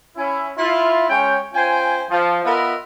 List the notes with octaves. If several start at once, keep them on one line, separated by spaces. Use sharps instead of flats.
C#4 E4
E4 F4
G#3 C#4 C#5 G5
C#4 F4 C5 G5 G#5
F3
B3 F4 A#4 D#5 E5 B5